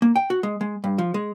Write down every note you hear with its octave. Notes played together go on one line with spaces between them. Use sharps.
A#3
G5
F#4
G#3
G#3
G2
F3
G#3